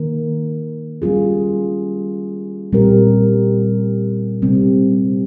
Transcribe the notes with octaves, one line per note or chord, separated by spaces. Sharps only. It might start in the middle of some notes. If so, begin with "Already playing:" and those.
Already playing: D#3 A#3 A#4
G3 C#4 F4 G#4
A#2 G3 C4 G4 A#4
C3 G3 C4